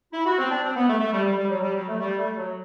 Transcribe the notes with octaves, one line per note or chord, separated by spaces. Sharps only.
E4
F#4
C4
D4
C4
B3
A3
A3
G3
G3
G3
F#3
G3
F#3
A3
G3
A3
F#3